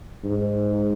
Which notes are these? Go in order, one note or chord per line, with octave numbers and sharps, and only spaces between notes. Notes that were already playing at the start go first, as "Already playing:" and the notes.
G#2